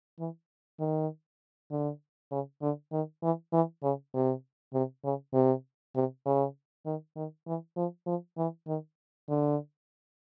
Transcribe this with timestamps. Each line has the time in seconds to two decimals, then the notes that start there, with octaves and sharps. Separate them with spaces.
0.19 E3
0.80 D#3
1.71 D3
2.31 C#3
2.62 D3
2.92 D#3
3.22 E3
3.53 E3
3.83 C#3
4.14 C3
4.74 C3
5.04 C#3
5.34 C3
5.95 C3
6.26 C#3
6.86 D#3
7.16 D#3
7.47 E3
7.77 F3
8.06 F3
8.37 E3
8.67 D#3
9.29 D3